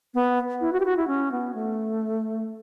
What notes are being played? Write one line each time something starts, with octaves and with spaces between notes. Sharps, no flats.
B3
E4
F#4
G4
F#4
E4
C#4
B3
A3